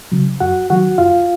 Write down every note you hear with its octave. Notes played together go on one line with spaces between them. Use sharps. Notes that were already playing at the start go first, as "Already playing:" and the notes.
C#3 F#3
F#2 F#4 F#5
D#3 F#3 F#4 F#5
F#2 F4 F5